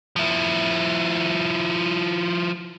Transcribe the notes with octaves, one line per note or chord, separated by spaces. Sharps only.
F3 E4